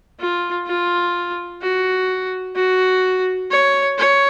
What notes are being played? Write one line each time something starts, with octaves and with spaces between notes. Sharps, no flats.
F4
F4
F#4
F#4
C#5
C#5